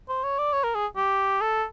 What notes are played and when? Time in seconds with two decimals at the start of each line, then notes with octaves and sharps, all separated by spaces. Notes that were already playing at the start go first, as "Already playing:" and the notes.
0.09 C5
0.24 C#5
0.39 D5
0.53 C#5
0.64 A#4
0.75 G#4
0.97 G4
1.41 A4